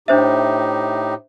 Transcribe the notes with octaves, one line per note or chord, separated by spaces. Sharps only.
A2 D4 D#4 G4 C5 E5